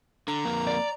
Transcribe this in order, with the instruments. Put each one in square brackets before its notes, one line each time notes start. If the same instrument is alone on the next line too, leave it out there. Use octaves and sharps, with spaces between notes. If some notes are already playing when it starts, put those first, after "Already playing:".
[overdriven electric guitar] D3 [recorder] A#5
[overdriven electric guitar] F2 A#3
[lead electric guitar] D5